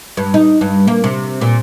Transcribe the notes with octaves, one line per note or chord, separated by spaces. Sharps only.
G2
D#4
G2
A#3
C3
A#2